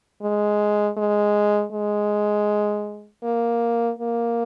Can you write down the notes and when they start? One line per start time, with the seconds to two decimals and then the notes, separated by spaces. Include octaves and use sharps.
0.22 G#3
0.97 G#3
1.73 G#3
3.23 A#3
3.99 A#3